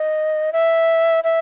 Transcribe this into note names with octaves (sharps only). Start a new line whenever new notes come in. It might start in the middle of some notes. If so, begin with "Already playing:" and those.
Already playing: D#5
E5
E5